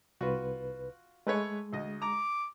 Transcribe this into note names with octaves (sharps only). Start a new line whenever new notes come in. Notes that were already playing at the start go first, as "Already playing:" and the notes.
C2 F4 F#4 B4
G#3 A3 B4 C#5
D2 D#5
A#5 D6